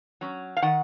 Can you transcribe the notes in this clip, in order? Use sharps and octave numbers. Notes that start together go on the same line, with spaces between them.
F#3 C#4
F5
D#3 F#5